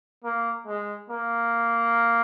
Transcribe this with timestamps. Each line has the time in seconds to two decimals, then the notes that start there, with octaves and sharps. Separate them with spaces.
0.24 A#3
0.67 G#3
1.10 A#3